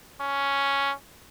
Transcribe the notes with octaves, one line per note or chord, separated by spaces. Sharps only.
C#4